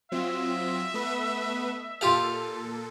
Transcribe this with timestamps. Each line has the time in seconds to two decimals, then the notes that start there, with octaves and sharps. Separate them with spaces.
0.12 F#3 C4 F4 D#5 E5
0.94 A3 B3 B4
2.01 A#2 F4 G4 A4 F5